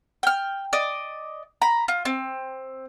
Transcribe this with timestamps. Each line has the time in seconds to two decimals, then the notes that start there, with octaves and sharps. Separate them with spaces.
0.23 G5 F6
0.73 D5 D#5
1.62 A#5 B5
1.88 F4
2.05 C4